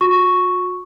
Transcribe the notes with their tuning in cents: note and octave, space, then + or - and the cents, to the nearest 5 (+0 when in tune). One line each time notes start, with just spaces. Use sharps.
F#4 -45 C#6 +0